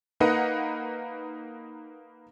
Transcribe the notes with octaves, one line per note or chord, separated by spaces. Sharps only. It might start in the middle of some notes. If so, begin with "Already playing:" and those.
A#3 D#4 A#4 B4 D#5 F#5